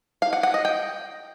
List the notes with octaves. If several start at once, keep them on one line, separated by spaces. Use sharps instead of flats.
F5
F#5
F#5
D#5
G5